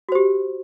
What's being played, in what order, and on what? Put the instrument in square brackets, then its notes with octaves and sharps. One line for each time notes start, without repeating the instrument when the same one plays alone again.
[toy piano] F#4
C5
G4